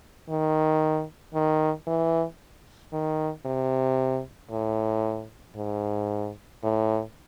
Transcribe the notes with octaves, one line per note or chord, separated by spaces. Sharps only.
D#3
D#3
E3
D#3
C3
A2
G#2
A2